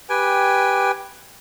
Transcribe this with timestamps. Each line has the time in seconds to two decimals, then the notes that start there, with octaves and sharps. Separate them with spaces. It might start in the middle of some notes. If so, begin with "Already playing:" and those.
0.09 G4 B4 G5 G#5